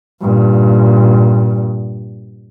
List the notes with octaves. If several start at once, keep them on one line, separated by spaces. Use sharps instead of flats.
G2 A#2